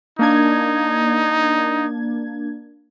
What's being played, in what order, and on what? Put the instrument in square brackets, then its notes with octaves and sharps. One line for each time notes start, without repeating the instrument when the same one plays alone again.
[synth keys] A#3 D4 G#6 [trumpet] D#4